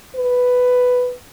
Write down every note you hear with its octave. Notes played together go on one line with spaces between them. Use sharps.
B4